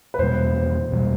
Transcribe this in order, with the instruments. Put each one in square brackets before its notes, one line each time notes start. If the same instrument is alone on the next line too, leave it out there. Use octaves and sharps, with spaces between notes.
[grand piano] B4
[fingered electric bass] E2 B2 G3 [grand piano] C5
[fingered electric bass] E2 B2 G3